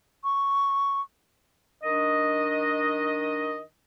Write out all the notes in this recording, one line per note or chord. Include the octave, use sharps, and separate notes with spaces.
C#6
D#3 D4 D#5